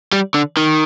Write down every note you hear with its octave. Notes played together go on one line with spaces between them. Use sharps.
G3
D3
D#3